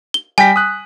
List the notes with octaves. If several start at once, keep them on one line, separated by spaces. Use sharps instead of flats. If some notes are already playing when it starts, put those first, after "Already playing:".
G7
G3 G5 G#5 B6
D#6 F#6